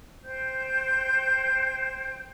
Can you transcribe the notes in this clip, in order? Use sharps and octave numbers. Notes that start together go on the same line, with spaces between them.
C5 G5 G6